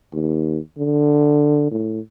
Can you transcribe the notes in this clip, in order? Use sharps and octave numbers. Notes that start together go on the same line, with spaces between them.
D#2
D3
A2